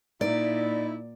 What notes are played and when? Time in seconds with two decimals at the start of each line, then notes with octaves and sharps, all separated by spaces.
0.21 A#2 D#4 E4 D5